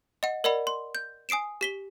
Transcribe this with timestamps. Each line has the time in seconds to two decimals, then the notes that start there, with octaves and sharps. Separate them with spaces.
0.23 D#5 F#5
0.44 A#4 D5 D#5 F#5 B5
0.67 C6
0.95 G6
1.29 G#5 D#6 C7 D7 E7
1.61 G4 B6 G7